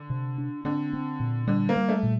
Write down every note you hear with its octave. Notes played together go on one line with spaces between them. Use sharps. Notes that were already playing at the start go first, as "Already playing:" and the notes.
Already playing: D3
C3
D4
D3 C4
C4
A#2
D3 G3
A#3
G3
A3
A#2